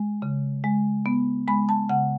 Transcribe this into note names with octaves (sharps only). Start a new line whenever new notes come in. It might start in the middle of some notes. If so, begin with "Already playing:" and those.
Already playing: G#3
C#3
G#3
B3
G#3 B5
A5
C#3 F#5